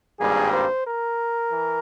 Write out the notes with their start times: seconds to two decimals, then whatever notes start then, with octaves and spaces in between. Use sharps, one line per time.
0.18 G#1 G2 G3 A#3 G#4
0.52 C5
0.86 A#4
1.51 E3